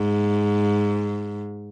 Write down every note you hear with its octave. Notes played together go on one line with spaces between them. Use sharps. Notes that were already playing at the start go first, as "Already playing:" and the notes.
Already playing: G#2